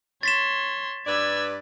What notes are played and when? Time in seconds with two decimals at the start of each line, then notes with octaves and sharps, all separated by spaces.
0.23 C#5 C6 A6 B6 E7
1.07 G2 B4 D5 E6 G#6